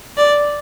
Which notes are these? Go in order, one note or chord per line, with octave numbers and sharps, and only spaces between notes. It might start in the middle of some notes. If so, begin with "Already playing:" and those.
D5